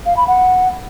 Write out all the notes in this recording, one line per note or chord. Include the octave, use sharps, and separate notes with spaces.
F5
B5
F#5